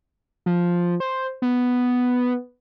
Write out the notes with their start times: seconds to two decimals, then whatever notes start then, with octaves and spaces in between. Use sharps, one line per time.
0.46 F3
1.00 C5
1.42 B3